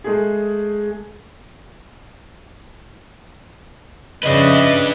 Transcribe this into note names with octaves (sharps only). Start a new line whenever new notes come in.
G#3 A3 G#4
F2 C#3 D4 B4 D#5 E5